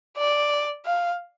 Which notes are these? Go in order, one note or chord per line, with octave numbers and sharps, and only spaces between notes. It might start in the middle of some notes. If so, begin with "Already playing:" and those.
D5
F5